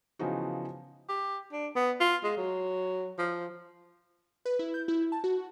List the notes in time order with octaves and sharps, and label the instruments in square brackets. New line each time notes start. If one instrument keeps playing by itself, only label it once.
[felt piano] C#3 E3 F3 B3 D#4 F#4
[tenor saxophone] G4
D4
B3
F4
G#3
F#3
F3
[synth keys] B4
E4
G6
E4
A5
F#4